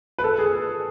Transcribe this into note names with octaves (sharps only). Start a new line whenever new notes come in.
B4
A4
G#4